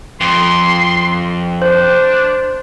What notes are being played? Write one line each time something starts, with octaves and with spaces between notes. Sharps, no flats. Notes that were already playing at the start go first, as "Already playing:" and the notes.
F2 C6
D4 C5